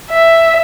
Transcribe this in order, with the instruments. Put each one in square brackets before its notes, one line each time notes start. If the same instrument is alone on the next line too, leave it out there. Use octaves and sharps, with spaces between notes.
[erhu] E5